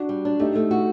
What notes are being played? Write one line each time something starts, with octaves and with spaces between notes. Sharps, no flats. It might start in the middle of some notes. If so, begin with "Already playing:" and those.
Already playing: D4 F#4
G3
D4
A3 D#4 G4
A3
F#4